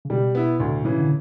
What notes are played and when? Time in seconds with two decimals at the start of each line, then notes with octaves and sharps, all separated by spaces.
0.05 C#3
0.10 B2 G3
0.35 B3 E4
0.60 D2 A2
0.85 C#3 E3
0.98 D3